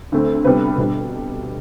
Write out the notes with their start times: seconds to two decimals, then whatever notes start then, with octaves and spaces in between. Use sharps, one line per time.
0.12 D2 D3 A3 C4
0.45 D2 C3 G3 B3 D4 B4
0.78 B2 G3 D4